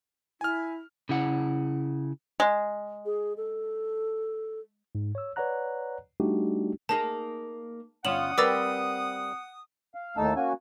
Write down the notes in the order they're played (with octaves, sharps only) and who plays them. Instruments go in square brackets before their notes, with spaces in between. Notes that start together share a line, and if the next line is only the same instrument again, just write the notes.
[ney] E4 [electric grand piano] G#5 F6
[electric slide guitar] C#3 E4 F#5
[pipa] G#3
[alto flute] G#4
A4
[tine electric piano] G#2
C#5 E6
B4 C#5 D5 F#5 A#5 F#6
G3 A3 D4 D#4 F#4 G4
[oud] A#3 D#4 G#4 [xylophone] A5
[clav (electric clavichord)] G1 F4 [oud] C#4 [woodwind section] F#5 D#6 [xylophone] E7 F#7
[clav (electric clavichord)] G3 [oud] C4 A#4 B4 [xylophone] D6 E6 A6
[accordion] F5
D#2 A2 A3 D#4 A5 E6
A#3 C#4 F#4 G#5